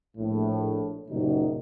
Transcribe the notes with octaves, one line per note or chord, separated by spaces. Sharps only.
A#1 A2
F#1 A#2 C#3 F#3 G3 D#4